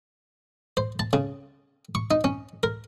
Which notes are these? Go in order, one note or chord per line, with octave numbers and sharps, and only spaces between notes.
C5
A5
C#3
C#6
D#4
C#4
A#4